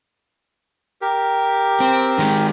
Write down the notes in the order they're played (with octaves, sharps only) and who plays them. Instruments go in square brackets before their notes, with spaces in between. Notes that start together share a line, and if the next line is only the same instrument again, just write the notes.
[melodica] G4 A#4
[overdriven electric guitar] C4
D#3 G#3